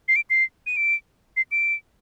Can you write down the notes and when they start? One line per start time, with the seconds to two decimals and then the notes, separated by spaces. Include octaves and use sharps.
0.08 C7
0.16 D7
0.30 C7
0.66 D#7
0.77 D7
1.37 C7
1.52 D7